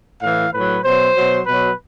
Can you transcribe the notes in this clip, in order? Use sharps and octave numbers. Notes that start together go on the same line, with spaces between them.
A2 E3 F5
A2 F#3 B4
B2 F#3 C5
B2 F#3
B2 F#3 B4